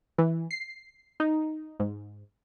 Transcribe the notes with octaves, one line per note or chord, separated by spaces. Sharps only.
E3
C7
D#4
G#2